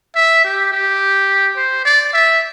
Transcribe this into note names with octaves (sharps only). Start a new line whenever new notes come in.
E5
G4
G4
C5
D5
E5